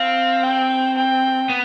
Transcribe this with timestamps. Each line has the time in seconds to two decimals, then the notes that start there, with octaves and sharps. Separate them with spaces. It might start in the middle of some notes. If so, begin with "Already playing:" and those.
Already playing: C4 F5
0.44 G5
0.97 G5
1.49 B3